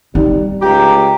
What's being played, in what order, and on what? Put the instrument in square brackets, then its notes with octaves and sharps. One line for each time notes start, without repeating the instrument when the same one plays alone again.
[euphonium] G3 [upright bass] D#4
[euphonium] C#2 [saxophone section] G4 [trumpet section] A#5